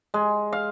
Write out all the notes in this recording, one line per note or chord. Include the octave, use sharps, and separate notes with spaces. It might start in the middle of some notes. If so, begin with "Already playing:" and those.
G#3
F5